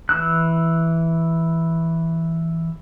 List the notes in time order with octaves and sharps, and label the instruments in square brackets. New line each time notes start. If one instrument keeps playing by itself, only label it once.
[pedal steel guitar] E3 E6 F#6